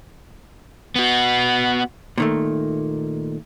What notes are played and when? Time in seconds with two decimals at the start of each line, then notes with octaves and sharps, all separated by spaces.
0.96 B3 F#4
2.18 A#2 D#3 A3